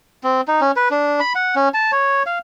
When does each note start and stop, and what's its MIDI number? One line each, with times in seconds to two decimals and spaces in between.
0.24 0.41 60
0.48 0.61 63
0.61 0.71 61
0.76 0.89 71
0.91 1.20 62
1.20 1.33 83
1.35 1.55 78
1.56 1.69 61
1.74 1.91 81
1.92 2.23 73
2.26 2.39 77